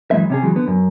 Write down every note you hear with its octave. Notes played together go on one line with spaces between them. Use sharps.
F#2 E3 G#3 C4 E5
C3 C#4 G#4
E3 F#3 G#3
D3 B3
F#2